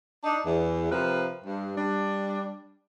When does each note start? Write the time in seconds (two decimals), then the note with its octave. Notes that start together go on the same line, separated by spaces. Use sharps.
0.23 D4 D#4
0.45 E2
0.90 C3 F3 A#4 B4
1.44 G2
1.77 G3 D4